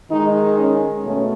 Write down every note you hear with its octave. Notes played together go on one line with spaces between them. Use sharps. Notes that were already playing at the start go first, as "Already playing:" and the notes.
D#3 G#3 D#4
C#4
B2 A3 C#4